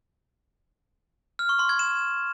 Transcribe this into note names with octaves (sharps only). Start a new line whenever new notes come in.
F6
C#6
C6
G#6
E7